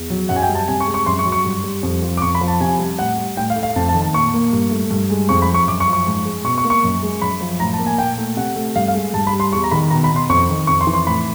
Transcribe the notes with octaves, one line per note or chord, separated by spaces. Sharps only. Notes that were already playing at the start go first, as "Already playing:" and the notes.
Already playing: E2
F#3
F#2 F#5
G#5
G5
G3
A5
C3 G#5
C#6
G#3
C#6
F#2 C6
C#6
F#3
C#6
G2
G3
F2
F3
D6
F2 C#6
B5
F3
A5
C3 G#5
G3
A2 F#5
G3
A2 G5
F5
A3
F5
F2 A5
A5
D#3
A5
A#2 C#6
A#3
G2
A3
G2
G#3
F2 C#6
B5
F3
C#6
F#2 D6
C#6
F3
C#6
G#2
G#3
B2 C#6
C#6
A#3
C#6
F#2
G#3
F#2 B5
F3
A2 A#5
A5
A#3
G#5
A#2 G5
A3
C3 F#5
A3
G2 F5
F5
G#3
G2 A5
B5
G3
C6
E2 C#6
A#5
D#3 B5
B2 A#5
B5
B2
C6
F2 C#6
D#3
F2 C#6
C6
E3
C6
A2 B5